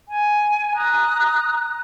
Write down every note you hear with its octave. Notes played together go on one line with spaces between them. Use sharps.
G#5
A#5 D#6 F#6